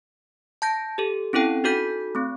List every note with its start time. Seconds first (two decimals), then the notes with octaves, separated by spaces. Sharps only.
0.62 A5 G6 A#6
0.98 G4 A4
1.33 C4 C#4 E4 A4 G5
1.64 D#4 F#4 A4 G6 B6
2.15 A3 C4